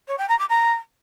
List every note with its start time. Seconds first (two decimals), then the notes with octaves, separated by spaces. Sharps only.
0.08 C#5
0.18 G5
0.29 A#5
0.39 D6
0.49 A#5